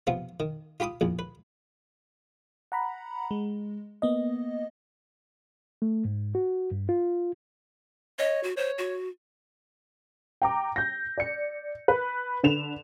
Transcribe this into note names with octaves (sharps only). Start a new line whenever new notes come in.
C3 F3 B3 F4
D#3
F4 G4 B5 D6 D#6
A#1 E2
B4
F#5 A#5 B5
G#3
A#3 B3 D#5
A3
G#2
F#4
G2
F4
C#5 D#5
F#4
C5 C#5
F#4
G5 A#5 D6
G6 A#6
D5 C#7
B4
D3 B4 E7 F7